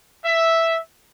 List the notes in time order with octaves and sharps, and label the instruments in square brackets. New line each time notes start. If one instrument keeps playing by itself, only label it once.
[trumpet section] E5